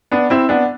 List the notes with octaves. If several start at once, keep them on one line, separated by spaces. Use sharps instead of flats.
B3 D4
C4 E4
B3 D4